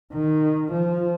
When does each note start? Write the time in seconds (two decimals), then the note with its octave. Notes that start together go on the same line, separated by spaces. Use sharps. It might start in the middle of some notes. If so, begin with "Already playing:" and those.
0.13 D#3
0.72 F3